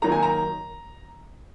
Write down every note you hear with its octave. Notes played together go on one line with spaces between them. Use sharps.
D#3 F#3 A#3 A#5
G#5
A#5